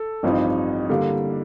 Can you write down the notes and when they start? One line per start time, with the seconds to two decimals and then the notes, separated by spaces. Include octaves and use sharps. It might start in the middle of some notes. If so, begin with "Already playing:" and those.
Already playing: A4
0.23 A1 G2 F3 C4 D#4
0.90 D3 G3 A#3